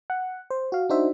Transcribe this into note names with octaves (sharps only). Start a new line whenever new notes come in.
F#5
C5
F#4 F5
D4 D#4 F#4 C5 E5